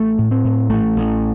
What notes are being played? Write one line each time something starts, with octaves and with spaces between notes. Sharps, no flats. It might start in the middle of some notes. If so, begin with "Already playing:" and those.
Already playing: A1 A3
A2
C4
A2
A1 A3
A1